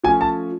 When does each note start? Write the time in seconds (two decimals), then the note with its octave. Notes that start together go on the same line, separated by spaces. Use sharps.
0.04 F3 A3 C#4 G#5
0.21 A5